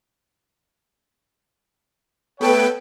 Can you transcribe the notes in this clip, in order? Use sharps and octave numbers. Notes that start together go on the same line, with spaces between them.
A3 B3 A4 B4 C#5 G5